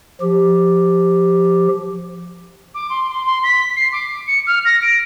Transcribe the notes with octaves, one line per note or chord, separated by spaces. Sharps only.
F3 G4
D6
C6
C6
C6
B6
C7
D6
C#7
F6
A#6
D7